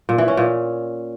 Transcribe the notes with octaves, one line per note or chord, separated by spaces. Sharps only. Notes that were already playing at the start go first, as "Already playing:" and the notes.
A#2
E3
C#4
A#2